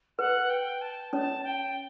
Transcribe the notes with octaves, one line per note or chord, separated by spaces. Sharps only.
B4 F#5
G5
A5
C#4 C#5 A5
G5